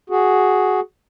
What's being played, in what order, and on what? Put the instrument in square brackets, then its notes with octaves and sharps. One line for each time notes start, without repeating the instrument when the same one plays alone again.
[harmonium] F#4 G#4